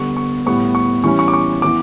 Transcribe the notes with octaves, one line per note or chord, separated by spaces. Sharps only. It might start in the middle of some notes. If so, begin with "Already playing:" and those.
Already playing: D3 G3 B3 C#6
C#6
A2 G3 B3 C#6
C#6
E3 G3 C#4 C#6
C#6
D6
C#6
E3 B3 D6